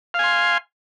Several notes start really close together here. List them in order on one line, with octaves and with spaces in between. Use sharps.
F5 G#5 C6